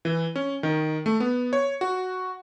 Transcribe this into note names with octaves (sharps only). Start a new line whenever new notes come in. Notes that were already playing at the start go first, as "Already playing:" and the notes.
E3
C#4
D#3
A3
B3
C#5
F#4